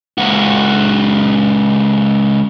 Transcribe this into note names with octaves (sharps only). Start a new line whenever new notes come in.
C#2 F#4